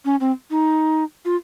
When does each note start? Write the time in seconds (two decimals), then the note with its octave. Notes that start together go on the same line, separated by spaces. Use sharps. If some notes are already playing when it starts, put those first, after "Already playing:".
0.05 C#4
0.20 C4
0.51 D#4
1.25 F4